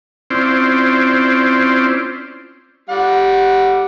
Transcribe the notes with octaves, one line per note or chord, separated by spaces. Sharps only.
C4 C#4 E4 F4 C5 D5
G3 F#5